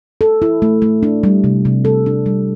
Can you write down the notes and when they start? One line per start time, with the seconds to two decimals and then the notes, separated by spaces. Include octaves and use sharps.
0.21 A4
0.42 E4
0.62 A3
0.82 A3
1.03 D4
1.24 G3
1.44 C3
1.65 C3
1.85 A4
2.06 D4
2.26 G3